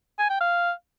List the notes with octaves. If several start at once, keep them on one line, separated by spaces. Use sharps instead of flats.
G#5
G5
F5